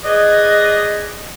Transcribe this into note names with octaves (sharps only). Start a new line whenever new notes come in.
G#4 B4 D5 D#5